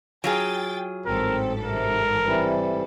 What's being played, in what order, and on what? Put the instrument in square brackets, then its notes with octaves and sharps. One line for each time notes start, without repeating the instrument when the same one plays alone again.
[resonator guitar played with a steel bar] F#3 F4 G#4 [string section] G5 A6
[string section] A1 G#2 A4 [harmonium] C4 [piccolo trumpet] A#4
[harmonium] C3 [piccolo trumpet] A#4
[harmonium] C3 E3 G3